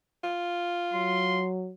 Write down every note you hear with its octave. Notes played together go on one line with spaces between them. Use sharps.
F4
F#3 C6